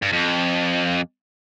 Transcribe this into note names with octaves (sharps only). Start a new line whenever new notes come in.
G2
F2